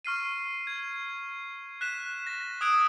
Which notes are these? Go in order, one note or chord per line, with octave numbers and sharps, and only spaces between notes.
C#6 F6 C7 D#7
G#6
F#6 B6 E7
A#6
D#6 E6 F#6 G#6 D7